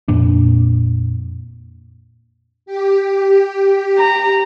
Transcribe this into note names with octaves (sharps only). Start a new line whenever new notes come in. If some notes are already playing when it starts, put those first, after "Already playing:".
F2 A#2 D4
G4
A#5